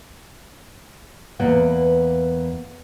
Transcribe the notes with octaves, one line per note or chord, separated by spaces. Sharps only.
E2 A#3 B4 F#5